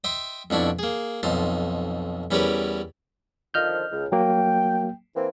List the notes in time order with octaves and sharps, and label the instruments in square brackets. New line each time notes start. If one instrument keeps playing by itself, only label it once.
[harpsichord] D#5 E5 G5 C6
F2 B2 D4 E4 C#6
A#3 G#4
B1 F2 D#4 A5 C6
E2 G3 C#4 G4 A#4 B4
[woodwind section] D3 D#3 F3 [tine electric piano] D#5 F6 G6
[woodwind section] C#2
[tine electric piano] F#3 A#3 [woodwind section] G5
[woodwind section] E3 A#3 C4